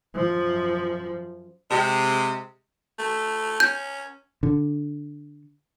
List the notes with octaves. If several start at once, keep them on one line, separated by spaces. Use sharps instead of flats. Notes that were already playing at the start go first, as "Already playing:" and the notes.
F#2 F3
C3 G#3
A3
C#4 G6
D3